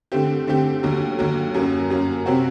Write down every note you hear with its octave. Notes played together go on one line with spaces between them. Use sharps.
D3 A3 C4 G4
D3 A3 C4 G4
D#2 D3 F#3
D#2 D3 F#3
F#2 F#3 A#3
F#2 F#3 A#3
C3 F#3 C4 F#4